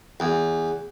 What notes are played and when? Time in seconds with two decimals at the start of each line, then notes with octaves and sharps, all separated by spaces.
0.20 E2